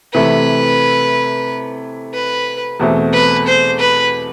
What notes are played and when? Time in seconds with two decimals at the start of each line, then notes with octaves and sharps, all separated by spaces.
0.13 C3 E3 A3 B4
2.14 B4
2.80 E2 B2 A3 C4
3.13 B4
3.47 C5
3.80 B4